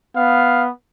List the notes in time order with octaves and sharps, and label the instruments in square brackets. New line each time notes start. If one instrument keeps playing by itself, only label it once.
[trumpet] B3 [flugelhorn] F5